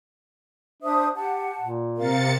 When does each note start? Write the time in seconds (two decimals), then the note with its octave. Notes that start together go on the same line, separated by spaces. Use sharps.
0.82 D4 C5 E5 D#6
1.15 G4 F#5 A5
1.61 A#2
1.96 C3 A#4 F5 A6 C#7